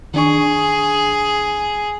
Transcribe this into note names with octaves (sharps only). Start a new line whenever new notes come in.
D#3 D4 G#4 C#6